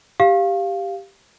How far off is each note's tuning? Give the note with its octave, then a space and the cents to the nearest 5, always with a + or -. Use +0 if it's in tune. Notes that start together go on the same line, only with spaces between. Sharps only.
G4 +0 F5 +0